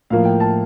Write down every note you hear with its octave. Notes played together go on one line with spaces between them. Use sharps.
A2 F3 A#3 F5
G5
A5